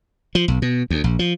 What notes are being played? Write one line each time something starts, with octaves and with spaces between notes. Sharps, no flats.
F3
B1
B2
D2
A#1
F3